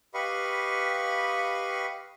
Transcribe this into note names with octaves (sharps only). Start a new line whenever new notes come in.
G4 B4 D#5 F5 B5 C#6